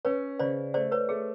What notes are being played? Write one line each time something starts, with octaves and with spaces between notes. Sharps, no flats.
C#4 B4 C#5
C#3 C5 D5
A3 C5 D5
B4 C#5
A3 G#4